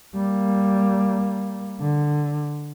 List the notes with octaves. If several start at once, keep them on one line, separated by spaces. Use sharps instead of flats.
G3 A#3
D3